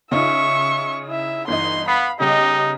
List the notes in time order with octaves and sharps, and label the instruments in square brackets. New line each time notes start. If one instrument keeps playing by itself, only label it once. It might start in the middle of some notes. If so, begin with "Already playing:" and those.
[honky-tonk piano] C#3 D#4 F4 [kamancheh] E5 C#6
[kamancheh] E4 E5
[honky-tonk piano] G1 E3 D#5 [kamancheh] D#4 C6
[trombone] B3 [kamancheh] F5 B5 [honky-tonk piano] C7
[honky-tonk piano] C#3 G3 B3 [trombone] D#4 [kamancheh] G4 D#5